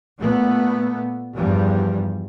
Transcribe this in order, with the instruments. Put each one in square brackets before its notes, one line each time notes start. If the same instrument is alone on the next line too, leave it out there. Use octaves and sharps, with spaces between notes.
[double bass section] A#2 A3 B3
E2 G2 F3 G3